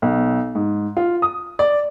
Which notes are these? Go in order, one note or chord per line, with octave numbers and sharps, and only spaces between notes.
B1
G#2
F4
D#6
D5